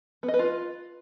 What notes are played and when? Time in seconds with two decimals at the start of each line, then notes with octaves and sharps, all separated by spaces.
0.23 B3
0.28 D#5
0.34 B4
0.39 F4